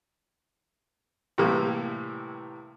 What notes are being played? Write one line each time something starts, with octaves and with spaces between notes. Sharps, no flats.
A2 C3 E3 G3 A#3